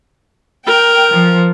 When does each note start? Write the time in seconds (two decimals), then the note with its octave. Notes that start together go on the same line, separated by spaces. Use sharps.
0.67 A#4 G5
1.13 F3